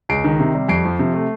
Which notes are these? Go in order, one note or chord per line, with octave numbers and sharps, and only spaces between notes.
C#2 C7 D7
D#3
C3
G3
F2 C7 D7
F3
C3
A3